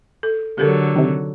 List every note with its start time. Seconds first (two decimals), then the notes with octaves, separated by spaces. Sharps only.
0.23 A4
0.58 D3 F#3 G4 A4 A#4
0.96 C3 D#3